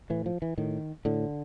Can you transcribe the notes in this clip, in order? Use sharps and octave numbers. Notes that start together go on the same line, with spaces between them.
A2 E3
F3
E3
A2 D#3
A2 D3